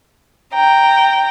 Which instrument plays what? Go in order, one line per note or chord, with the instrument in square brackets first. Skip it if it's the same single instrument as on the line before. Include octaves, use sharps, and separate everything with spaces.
[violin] G5 A#5